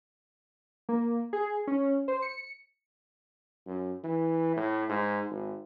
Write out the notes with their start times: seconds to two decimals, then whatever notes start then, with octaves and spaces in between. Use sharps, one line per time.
0.89 A#3
1.33 G#4
1.67 C#4
2.08 C5
2.22 C#7
3.67 F#2
4.04 E3
4.57 A2
4.90 G#2
5.31 G#1